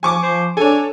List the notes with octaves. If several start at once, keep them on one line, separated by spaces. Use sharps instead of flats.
F3 G#5 C#6 D6
F3 C5
D4 A4 C#5 G#5